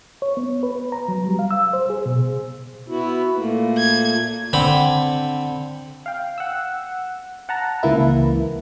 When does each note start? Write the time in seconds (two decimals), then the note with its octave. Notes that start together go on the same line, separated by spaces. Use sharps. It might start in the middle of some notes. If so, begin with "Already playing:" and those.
0.22 C#5
0.37 B3
0.63 B4
0.92 A#5
1.08 F#3
1.27 G3
1.39 F5
1.51 E6
1.73 C5
1.90 G#4
2.06 B2
2.88 B3 E4 F#4
3.36 A#2 A3 A#3
3.78 G#6
4.53 D3 C4 B5
6.06 F5 G5
6.38 F#5 E6
7.49 F#5 A5 A#5
7.83 C#2 E3 A#3 E4